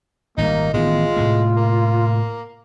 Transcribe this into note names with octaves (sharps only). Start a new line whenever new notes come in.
G#1 A#2 G3 A#3 D#4
A1 D#3 G#3 B3 F4
A2 C3 A3
A#3